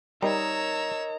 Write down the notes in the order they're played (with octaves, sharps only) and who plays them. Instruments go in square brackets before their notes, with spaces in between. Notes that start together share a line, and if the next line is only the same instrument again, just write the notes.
[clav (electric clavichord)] G3 [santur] D#4 A#4 [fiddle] C#5 E6 [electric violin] A#5